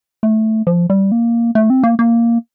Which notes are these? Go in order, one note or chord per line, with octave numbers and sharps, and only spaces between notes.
A3
F3
G3
A#3
A3
C4
A#3
A#3